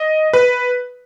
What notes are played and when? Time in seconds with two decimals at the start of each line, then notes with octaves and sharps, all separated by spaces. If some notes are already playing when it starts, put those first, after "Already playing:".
Already playing: D#5
0.33 B4